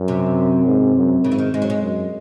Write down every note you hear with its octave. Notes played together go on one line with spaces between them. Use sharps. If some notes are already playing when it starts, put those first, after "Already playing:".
Already playing: F#2
C3
G#2
F#2
G#2 C#3
E3
D#3
G#2 G#3
F#3
G#3
F#2